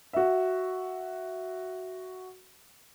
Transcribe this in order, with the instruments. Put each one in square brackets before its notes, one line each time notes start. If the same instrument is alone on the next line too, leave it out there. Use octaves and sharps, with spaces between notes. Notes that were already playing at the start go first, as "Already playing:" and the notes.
[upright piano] F#4 E5